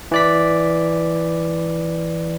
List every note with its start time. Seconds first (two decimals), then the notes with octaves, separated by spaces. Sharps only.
0.11 E3 D5 B6